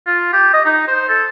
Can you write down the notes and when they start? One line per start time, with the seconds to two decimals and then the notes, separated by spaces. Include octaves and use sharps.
0.06 F4
0.33 G4
0.54 D#5
0.65 D#4
0.88 C5
1.09 A4